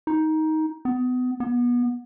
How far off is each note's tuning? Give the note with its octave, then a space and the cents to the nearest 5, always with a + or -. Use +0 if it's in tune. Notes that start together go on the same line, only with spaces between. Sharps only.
D#4 +15
B3 +30
B3 -25